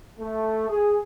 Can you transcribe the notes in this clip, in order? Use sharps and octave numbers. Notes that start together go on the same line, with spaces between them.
A3
G#4